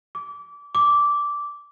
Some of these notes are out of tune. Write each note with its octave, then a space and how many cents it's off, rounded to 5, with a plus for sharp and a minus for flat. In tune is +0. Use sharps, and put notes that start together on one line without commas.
D6 -25
D6 -10